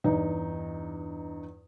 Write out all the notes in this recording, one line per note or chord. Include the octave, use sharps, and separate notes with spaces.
E2 G2 D#4